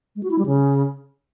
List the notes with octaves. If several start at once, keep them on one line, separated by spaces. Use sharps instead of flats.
G#3
F#4
E4
G3
C#3